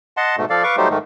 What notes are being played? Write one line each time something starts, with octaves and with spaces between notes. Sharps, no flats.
D#5 F#5 A5 C6
G#2 B2 A3
F3 A4 D5 F5
B4 F5 C#6 D6
F#3 G3 A3 D#4 G4 C5
G#2 D#3 A3